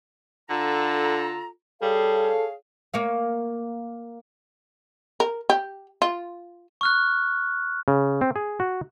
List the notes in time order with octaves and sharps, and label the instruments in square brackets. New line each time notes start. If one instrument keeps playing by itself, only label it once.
[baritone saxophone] D3 [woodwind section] F4 A4 A#5
[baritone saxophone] G3 [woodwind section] G#4 C#5 F5 [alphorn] A4
[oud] A#3 C#5 F5
[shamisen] A#4
G4
F4
[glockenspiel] C#6 F6 F#6
[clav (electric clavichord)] C#3
C4
G#4
F#4